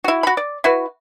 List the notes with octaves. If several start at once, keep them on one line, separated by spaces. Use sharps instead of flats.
E4 F#4
F#4 B5
D5
E4 F#4 B4